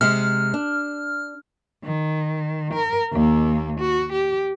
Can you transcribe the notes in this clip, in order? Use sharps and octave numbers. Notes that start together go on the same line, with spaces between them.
C3 G#3 F6
D4
D#3
A#4
D#2 A#3
F#4
G4